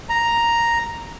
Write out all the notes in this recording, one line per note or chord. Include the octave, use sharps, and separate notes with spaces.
A#5